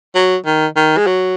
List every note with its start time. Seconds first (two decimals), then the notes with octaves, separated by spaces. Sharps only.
0.15 F#3
0.45 D#3
0.76 D#3
0.97 G#3
1.06 F#3